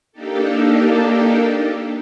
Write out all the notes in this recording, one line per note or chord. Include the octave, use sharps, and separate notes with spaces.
A#3 D4 D#4 G4 A4